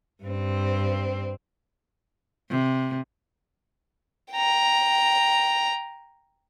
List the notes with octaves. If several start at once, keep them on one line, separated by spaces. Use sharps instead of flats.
G2 C4
C3
G5 A#5